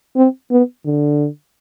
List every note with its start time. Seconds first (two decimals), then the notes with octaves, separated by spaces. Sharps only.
0.16 C4
0.51 B3
0.86 D3